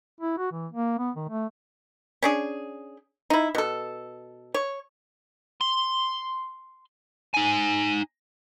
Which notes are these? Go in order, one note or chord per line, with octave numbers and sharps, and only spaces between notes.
E4
F#4
E3
A#3
B3
D#3
A3
C#4 D4 G#4
D#4 E4
B2 A4
C#5
C6
D#4 G#5